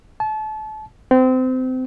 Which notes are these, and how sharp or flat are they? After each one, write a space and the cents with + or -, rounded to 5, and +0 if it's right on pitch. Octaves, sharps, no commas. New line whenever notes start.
A5 -30
C4 -25